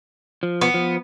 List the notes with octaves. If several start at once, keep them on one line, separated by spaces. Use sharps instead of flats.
F3
B3
F3